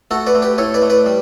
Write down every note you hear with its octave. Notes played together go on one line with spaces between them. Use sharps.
A3 F#4 A4
B4 D5
A3
G4 B4
A2 A4 C#5
B4 D5
A3
B4 D5
G3